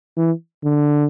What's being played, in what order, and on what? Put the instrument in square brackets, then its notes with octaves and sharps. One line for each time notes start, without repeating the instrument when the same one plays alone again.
[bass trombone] E3
D3